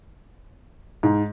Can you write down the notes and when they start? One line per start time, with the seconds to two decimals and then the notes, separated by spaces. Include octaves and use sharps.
1.03 G#2